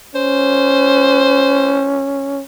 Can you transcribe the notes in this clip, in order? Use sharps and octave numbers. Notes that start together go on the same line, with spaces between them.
C#4 C5